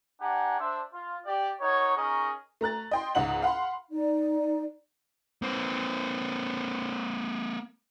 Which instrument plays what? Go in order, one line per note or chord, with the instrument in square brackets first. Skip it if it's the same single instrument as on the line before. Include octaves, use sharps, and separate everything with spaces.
[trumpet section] D4 G4 D5 F#5 G#5 A#5
D4 C5 E5
F4
G4 D5
D#4 F#4 A#4 C#5
C#4 D#4 G#4 A#4 D#5 C#6
[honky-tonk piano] A3 A#5 F#6 A6
D#5 G5 C6
C#2 G#2 D#5 F#5 F#7
F5 F#5 B5 C6
[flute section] D#4 D5
[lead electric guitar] A#3 C4